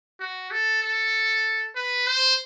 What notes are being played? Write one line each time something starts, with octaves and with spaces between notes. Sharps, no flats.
F#4
A4
A4
B4
C5